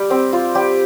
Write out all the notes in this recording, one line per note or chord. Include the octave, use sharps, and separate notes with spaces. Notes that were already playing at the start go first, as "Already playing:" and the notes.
Already playing: G3 G4
C4
F4
G3 G4